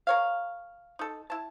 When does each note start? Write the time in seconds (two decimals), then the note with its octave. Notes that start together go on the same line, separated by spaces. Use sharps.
0.07 A#4 C#5 F5
0.99 D#4 A4
1.30 E4 A5